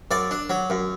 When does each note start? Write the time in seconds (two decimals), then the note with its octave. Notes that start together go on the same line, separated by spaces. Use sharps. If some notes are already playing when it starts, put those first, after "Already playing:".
0.11 F#2 D5
0.31 D4
0.50 F#3
0.70 F#2